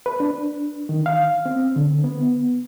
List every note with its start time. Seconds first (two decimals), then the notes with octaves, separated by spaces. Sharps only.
0.06 B4
0.20 D4
0.89 D#3
1.06 F5
1.46 C4
1.76 D3
2.04 B3